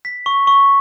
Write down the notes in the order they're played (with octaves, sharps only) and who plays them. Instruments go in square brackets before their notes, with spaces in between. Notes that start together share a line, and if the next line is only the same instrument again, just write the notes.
[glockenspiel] B6
C#6
C#6